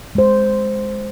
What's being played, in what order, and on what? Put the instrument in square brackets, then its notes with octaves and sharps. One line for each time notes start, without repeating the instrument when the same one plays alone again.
[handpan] G#3 C5